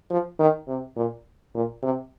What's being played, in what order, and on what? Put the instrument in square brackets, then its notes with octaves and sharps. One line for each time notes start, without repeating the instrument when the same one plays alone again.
[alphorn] F3
D#3
C3
A#2
A#2
C3